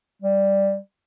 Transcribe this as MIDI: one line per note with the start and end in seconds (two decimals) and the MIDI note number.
0.22 0.78 55